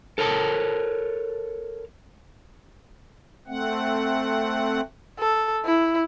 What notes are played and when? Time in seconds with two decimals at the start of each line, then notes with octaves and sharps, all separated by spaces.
0.18 A4 A#4 C#5 A5
3.48 A3 C4 F#5
5.19 A4
5.65 E4